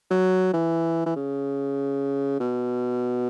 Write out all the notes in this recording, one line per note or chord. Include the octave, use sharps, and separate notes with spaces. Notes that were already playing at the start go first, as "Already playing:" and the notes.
F#3
E3
E3
C#3
B2